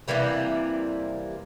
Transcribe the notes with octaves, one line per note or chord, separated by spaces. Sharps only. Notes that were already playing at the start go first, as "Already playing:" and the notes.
C3 E3 G3 A#3